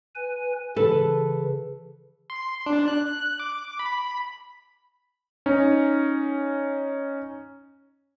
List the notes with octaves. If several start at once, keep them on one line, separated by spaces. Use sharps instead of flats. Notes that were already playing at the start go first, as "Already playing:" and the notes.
B4 G#5
C#3 E3 A4 B4
C6
D4
F#6
D6
B5
C#4 D#4